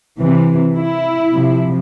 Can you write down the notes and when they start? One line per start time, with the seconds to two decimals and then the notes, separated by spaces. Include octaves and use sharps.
0.19 C3 E3
0.75 E4
1.34 C3 F3